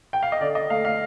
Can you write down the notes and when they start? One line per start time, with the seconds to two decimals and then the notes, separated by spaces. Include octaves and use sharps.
0.13 G5
0.23 F5
0.32 D#5
0.41 D3 D5
0.55 D#5
0.70 A3 F5
0.85 F5